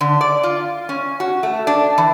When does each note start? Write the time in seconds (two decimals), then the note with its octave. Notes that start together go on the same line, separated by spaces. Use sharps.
0.01 D3
0.21 D5
0.43 F4
0.89 C#4
1.20 F#4
1.43 A3
1.67 D4
1.98 E3